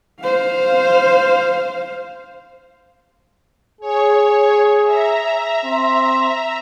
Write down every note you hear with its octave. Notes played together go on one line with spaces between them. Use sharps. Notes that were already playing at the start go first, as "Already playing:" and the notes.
C5 F5
G#4 C#5
E5 A#5
C4